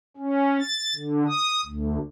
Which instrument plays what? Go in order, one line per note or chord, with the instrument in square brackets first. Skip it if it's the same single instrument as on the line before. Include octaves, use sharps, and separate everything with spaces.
[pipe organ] C#4
A6
D3
D#6
D2